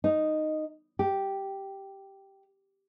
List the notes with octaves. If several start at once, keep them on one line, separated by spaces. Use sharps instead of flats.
D#4
G4